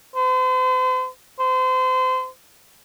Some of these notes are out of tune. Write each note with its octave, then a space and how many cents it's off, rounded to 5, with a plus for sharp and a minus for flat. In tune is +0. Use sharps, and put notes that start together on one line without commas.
C5 -40
C5 -30